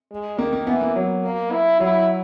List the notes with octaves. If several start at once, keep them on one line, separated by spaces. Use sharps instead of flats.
G#3
D#3 A#3
A#3
E3 B3
A#3
F#3
A#3
E4
F#3 E4